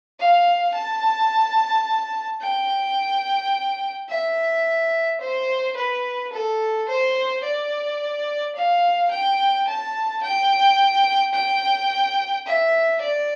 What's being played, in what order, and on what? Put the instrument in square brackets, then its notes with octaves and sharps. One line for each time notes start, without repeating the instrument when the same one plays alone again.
[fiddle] F5
A5
G5
E5
C5
B4
A4
C5
D5
F5
G5
A5
G5
G5
E5
D5